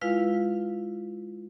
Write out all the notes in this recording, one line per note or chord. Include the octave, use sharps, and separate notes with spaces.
G#3 E4 F4 B4 F5